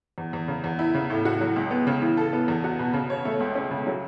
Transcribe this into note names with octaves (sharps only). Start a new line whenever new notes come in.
E2
E2
C#3
E2
E4
C#3
A2
F#4
F#3
C#2
B3
C#3
E3
A4
B3
E2
F#4
B2
C#3
C#5
A3
C#2
C#4
C#3
F#3